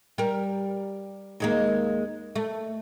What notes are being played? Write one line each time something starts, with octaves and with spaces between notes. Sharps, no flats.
G3 A#4
D#2 G#3 A#3
A3